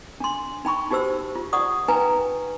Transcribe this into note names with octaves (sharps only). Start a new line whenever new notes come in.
D4 C6
D#4 G5 B5 C#6
D#4 F#4 G4 C5 E6
F4
D5 F#5 C#6 D#6
D#4 B4 G5 G#5 A#5